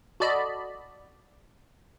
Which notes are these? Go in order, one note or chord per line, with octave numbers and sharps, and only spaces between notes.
F#4 A4 D5 D#5 B5